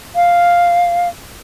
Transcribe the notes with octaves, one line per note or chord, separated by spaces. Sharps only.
F5